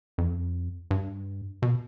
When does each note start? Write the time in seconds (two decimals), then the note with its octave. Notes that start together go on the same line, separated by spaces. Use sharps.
0.18 F2
0.91 G2
1.62 B2